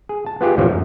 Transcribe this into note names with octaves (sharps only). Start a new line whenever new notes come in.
G#4
A5
B3 F4 G4 G#4
D#2 A2 C3 E3 F3 G3
F#2